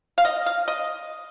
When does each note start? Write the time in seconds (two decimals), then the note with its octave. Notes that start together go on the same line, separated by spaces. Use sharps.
0.18 F5
0.25 D#5
0.46 F5
0.68 D#5